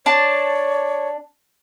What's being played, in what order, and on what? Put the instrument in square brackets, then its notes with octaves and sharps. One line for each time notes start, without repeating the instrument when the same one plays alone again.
[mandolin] D4 A5 [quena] C#5